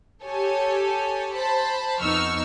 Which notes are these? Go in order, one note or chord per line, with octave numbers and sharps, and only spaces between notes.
G4 A4 C#5 G#5 A5
C5 A5 B5
F2 B3 D#4 C#6 E6 F6